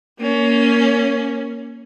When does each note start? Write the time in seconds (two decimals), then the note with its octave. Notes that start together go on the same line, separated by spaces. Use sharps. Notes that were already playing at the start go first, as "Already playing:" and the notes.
0.19 A#3 C#4